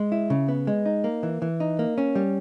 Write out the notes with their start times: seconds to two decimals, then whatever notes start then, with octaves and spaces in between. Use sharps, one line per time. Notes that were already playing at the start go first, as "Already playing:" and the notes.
Already playing: G#3
0.12 E4
0.30 C#3
0.48 B3
0.67 G#3
0.86 D#4
1.04 A#3
1.23 E3
1.42 E3
1.60 D#4
1.79 A#3
1.98 C#4
2.15 G3